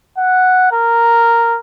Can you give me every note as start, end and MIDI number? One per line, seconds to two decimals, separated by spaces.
0.18 0.70 78
0.72 1.58 70